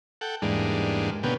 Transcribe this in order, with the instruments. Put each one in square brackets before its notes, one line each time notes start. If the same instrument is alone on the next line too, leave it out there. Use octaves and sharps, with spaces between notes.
[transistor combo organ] A4 F#5 G5
E2 G#2 G3 G#3 A#3 D4
B2 D3 A#3 B3 C#4 G4